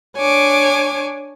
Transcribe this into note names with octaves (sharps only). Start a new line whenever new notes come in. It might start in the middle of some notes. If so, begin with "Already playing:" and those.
D4 C#5 G#5 D6